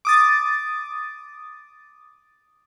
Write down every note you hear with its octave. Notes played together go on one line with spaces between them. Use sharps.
D6 D#6 A6